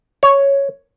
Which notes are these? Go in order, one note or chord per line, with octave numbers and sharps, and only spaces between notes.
C#5